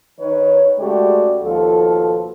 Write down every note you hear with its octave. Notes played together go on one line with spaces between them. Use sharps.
D#3 D#4 B4 C#5
C#3 G#3 A3 F#4 G4 D5
D#2 B2 F3 F4 A4